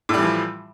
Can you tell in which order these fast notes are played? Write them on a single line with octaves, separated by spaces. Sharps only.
A2 G3 E3 F3